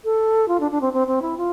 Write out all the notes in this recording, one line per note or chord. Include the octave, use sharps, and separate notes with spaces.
A4
F4
D4
D4
C4
C4
C4
E4
F4